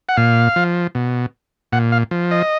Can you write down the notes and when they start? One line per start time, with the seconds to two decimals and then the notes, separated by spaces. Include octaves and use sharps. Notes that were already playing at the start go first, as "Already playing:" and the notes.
0.09 F#5
0.17 A#2 F5
0.56 F3
0.95 B2
1.72 A#2 F#5
1.92 F5
2.11 F3
2.31 D#5